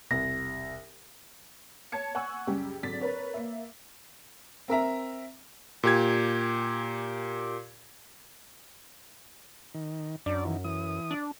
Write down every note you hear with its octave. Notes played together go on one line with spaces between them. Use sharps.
E1 C2 A#6
C#5 A5 G#6 C#7
F#5 G#5 C#6 E6
C#2 F#2 G3 G4
G#1 D3 F#3 D4 A6 B6
A#4 B4 C#5
A#3 E5
C4 A#4 E5 A#5
A#2 G4 G#6
D#3
F#2 D4 D5
D#3 E3
E3 D#6
D4